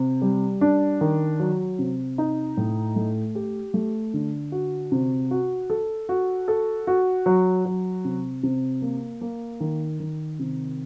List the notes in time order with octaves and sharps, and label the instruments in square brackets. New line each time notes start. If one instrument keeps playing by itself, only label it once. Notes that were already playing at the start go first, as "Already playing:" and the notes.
Already playing: [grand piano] C3
G3
D4
D#3
F#3
C3
D#4
A2
A3
G4
A3
D3
F#4
C3
F#4
A4
F#4
A4
F#4
F#3
F#3
C3
C3
A#3
A#3
D#3
D#3
C3